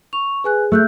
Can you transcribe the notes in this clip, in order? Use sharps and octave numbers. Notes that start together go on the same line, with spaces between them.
C#6 F7
G#4 B4 G#5 F#6
A3 E6 F#6 G6